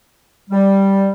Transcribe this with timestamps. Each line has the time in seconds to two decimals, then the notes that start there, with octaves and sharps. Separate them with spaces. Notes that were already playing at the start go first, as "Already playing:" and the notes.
0.50 G3